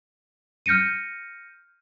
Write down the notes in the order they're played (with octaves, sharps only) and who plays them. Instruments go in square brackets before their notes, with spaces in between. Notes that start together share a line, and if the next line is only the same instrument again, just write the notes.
[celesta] F6 G6 A#6 C#7 D#7